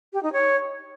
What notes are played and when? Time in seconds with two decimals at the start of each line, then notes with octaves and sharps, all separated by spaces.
0.13 G4
0.23 D#4
0.33 C#5